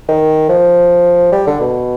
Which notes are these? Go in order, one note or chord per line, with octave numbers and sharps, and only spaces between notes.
D#3
F3
G3
D3
B2